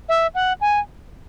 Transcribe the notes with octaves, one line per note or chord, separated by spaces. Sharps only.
E5
F#5
G#5